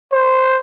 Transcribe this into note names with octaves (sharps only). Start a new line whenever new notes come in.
C5